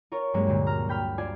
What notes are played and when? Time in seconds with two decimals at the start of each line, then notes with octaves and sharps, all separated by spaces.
0.12 F4 A#4 C#5
0.34 G2 F#3 G#3 A#3 C#4 F#4
0.47 D2 A#2
0.67 A#5 F6
0.89 G5 B5 F6
1.18 F4 C5 D5 G#5